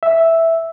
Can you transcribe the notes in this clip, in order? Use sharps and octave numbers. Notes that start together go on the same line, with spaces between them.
E5